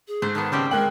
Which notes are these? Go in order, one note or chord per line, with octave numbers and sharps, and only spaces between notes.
G#4
G#2 A3 C5
D#3 B3 A5
C#3 G3 C4 G4
G#3 A#4 G5 F#6 F#7